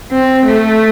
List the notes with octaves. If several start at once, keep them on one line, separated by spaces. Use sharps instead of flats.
C4
A3